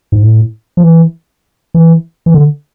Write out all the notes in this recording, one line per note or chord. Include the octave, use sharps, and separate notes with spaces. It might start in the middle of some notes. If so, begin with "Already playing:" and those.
G#2
A2
F3
E3
E3
E3
D3